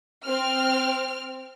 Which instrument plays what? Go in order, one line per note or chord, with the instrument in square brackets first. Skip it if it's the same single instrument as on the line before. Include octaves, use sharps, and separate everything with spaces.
[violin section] C4 F6